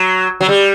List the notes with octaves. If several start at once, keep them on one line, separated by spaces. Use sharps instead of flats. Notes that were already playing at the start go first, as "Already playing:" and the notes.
Already playing: F#3
F#3
G3